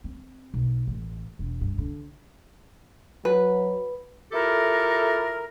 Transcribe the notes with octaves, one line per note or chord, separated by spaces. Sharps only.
C4
B1
A1
E1
G2
D3
F#3 B4
A3 E4 F4 G4 A4 A#4